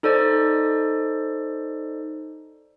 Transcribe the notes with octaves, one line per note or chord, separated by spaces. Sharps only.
D#4 A4 C5 D5 D#5